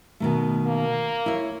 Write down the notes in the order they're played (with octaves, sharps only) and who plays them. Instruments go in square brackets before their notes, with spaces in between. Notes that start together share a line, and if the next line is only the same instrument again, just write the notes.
[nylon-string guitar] B2 D#3 A3
[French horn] A#3
[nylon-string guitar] E4 C#5